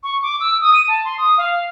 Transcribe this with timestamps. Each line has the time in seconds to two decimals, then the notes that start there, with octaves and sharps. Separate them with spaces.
0.03 C#6
0.22 D6
0.40 E6
0.61 D#6
0.73 D#7
0.88 A5
1.04 C6
1.18 D#6
1.38 F5